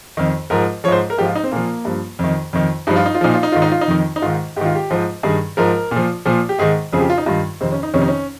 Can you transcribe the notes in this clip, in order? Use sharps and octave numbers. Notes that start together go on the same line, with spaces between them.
F2 D#3
G#2 F3 A#4
G#2 F3 C5 C#5
A#4
G#2 F3 G4
F4
D#4
C4
A#2 F3 A#3
G2 F3
F2 D#3
F2 D#3
G2 F3 D#4
F4
D#4
F4
A#2 F3 D#4
F4
D#4
G#2 D#3 F4
D#4
F4
D#4
F2 D#3
D#4
G#2 D#3 F4
G#2 D#3 F4 G4
G4
G#2 F3
G2 D#3 G#4
G#2 F3 A#4
A#2
F3
A#2 F3
G4
G#2 D#3 G#4
F2 C#3 F3 G#4
G4
F4
D#4
G2 D#3 F4
F2 C3 D#3 C4
C#4
D#4
F2 C3 D#3 C#4
D#4
C#4